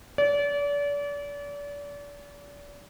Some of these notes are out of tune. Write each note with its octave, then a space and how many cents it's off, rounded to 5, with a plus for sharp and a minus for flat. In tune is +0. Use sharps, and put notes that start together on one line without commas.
D5 -35